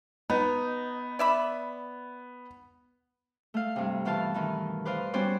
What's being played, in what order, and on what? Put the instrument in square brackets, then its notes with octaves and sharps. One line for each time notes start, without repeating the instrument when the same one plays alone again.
[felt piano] B3 [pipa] D#4
[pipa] D5 E5 B5
[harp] A3 F5
G2 C3
B2 E3 F4 F5 A5
D#3 E3 D#4
B4 C5 D5 D#5 F5
G3 B3 C#4 F#4 C5 D5